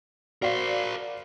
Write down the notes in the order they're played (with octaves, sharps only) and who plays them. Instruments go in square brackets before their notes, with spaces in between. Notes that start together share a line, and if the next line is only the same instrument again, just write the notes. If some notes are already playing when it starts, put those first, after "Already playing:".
[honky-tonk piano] F#4 D5 F5 [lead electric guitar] A#4 C5